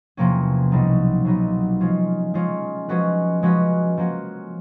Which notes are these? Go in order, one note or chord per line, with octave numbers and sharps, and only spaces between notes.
E2 C3 F3 A#3 C#4
C2 B2 F#3 B3 D#4
C2 B2 F#3 B3 D#4
F3 G#3 C#4 F4
F3 G#3 C#4 F4
F3 G#3 C#4 F#4 B4
F3 G#3 C#4 F#4 B4
F3 A#3 C#4 F#4